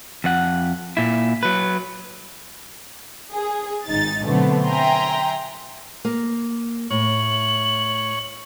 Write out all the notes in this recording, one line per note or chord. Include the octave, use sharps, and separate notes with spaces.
F2 F#5
A#2 E4
F#3 B4
G#4
G#1 D#4 A6
B2 D3 F#3 A3 B3 C4
E5 G5 G#5 A#5 C6
A#3
A2 C#5 F#7